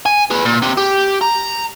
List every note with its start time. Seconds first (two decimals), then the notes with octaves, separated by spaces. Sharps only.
0.06 G#5
0.31 G#4 B4
0.46 A#2
0.62 C3 G4
0.78 G4
1.21 A#5